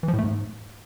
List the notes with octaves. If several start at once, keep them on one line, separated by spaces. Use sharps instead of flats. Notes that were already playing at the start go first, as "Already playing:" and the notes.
E3
F3
A2
A3
G#2